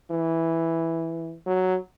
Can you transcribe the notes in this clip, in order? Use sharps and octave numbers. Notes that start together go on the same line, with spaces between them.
E3
F#3